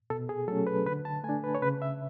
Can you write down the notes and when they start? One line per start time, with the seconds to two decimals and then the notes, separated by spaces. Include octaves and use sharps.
0.10 B2 A4
0.29 G#4
0.48 F#3 A3 C#4 A4
0.67 B4
0.86 D3 B4
1.05 A5
1.24 A3 G#5
1.29 D4
1.44 B4
1.55 C#5
1.62 C#3 B4
1.82 E5